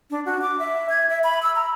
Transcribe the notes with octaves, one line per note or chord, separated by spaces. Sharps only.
D4
F#4
D6
E5
G#6
E5
B5
E6
A#5